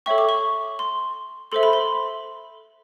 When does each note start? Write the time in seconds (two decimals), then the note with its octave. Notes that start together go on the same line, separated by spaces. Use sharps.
0.06 A4 C#5 E5 G5 C#6
0.18 D6
0.29 C#6
0.79 C6
1.52 A4 C5 E5 C6
1.63 B5
1.73 C6